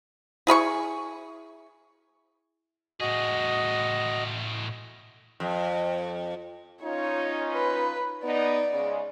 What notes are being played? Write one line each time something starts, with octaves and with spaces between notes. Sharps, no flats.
E4 G#4 B5 C#6
A2 F#4 G#4 D#5
F2
C#4 D#4 F4 C#5
B4
B3 D#4 D5
C#3 G#3